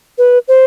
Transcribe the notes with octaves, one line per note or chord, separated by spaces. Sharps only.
B4
C5